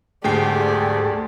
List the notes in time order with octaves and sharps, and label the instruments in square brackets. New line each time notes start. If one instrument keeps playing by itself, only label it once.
[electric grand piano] D2 G5 C7 [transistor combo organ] G#2 A3 [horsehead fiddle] G4 D5 [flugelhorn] G#4